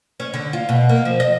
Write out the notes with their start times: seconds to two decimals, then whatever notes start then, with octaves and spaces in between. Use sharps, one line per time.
0.20 C#4
0.34 D3
0.53 F4
0.69 B2
0.89 A#3
1.05 F3
1.20 D#5